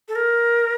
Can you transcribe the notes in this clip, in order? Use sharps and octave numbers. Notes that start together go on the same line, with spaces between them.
A4
A#4